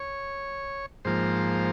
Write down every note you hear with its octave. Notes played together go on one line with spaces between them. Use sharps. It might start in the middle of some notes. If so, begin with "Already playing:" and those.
Already playing: C#5
G#2 F3 A#3 C5